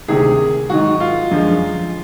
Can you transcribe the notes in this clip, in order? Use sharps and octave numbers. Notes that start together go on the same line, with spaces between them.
D2 C3 D#3 G#4
G#2 D#3 F#3 F#4
F4
F#2 D3 F3 G#3